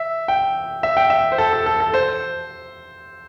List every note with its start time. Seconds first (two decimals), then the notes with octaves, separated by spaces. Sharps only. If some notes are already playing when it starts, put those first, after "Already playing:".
Already playing: E5
0.28 G5
0.83 E5
0.97 G5
1.10 E5
1.32 C5
1.38 A4
1.53 A4
1.66 A4
1.80 A4
1.94 C5